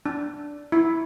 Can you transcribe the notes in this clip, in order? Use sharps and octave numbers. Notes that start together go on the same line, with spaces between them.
D4
E4